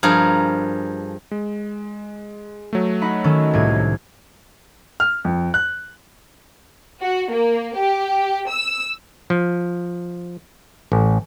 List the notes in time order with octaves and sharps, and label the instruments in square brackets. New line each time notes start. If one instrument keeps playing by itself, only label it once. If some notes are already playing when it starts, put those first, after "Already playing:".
[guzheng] G2 F3 G#4 A#4
[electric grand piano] G#3
F#3 A3
[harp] D#4 F#5 B5
D#3 C#4 A4
C2 A2 G#6
[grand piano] F6
F2
F#6
[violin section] F#4
A#3
G4
E6
[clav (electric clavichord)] F3
A1